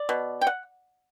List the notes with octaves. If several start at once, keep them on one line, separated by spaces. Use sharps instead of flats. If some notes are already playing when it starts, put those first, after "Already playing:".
Already playing: D5
B2
G5
F#5